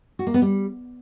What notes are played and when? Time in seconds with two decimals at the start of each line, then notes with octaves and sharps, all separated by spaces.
0.19 F#4
0.27 A#3
0.34 B3
0.42 G3